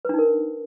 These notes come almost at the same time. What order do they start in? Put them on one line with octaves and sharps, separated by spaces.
B4 D4 D#4 A#4